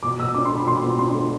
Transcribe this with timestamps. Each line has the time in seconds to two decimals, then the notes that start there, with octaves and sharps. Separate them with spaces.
0.03 B2 D6
0.20 B2 E6
0.34 D4 D6
0.46 C6
0.51 A3
0.57 B5
0.67 B2 C6
0.83 B2
0.99 D4 C6
1.14 A3